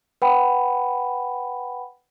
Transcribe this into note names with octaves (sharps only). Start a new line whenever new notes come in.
B4 F#5 G5 B5